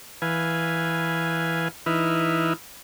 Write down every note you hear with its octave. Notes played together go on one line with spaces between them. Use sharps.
E3 B4 F5 G#5
E3 D#4 E4 B4 F6